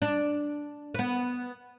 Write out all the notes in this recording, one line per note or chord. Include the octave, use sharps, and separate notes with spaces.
D4
B3 B4